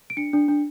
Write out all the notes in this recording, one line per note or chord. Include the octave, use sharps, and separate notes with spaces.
D7
D4 C#7
D4
D4